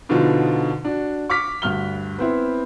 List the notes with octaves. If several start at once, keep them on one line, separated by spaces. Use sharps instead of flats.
B2 D3 F3 B3 D#4 F4
D4 F#4
C#6 D6 F6 B6
D2 G2 F6 G7
B3 C4 E4